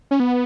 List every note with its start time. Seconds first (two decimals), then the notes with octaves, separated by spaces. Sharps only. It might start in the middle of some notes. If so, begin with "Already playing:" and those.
0.11 C#4
0.20 B3